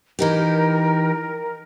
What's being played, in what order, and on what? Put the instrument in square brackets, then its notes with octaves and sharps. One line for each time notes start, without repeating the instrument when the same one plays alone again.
[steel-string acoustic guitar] E3 D#4 G4 [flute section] A#4